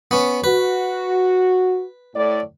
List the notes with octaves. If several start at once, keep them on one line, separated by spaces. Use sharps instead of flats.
B3 C#4
F#4 B4
A2 D5